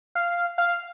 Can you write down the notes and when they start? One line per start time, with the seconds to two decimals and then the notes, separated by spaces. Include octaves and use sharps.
0.15 F5
0.58 F5